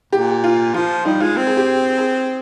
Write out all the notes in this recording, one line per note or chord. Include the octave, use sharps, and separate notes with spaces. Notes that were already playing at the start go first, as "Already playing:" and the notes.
A#2 G4
F4
F3 F4
G3 D#4
G#3 F4
C4
G#4
G4
G#4